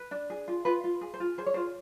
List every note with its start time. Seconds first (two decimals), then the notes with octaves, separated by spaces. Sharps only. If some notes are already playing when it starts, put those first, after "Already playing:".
Already playing: B4
0.11 D4
0.30 G#4
0.48 F4
0.65 F4 B4
0.84 F4
1.01 G#4
1.14 C5
1.20 F4
1.38 G#4 C5
1.46 C#5
1.54 F4 C5